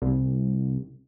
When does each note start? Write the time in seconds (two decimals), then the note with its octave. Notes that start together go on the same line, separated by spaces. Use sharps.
0.02 C2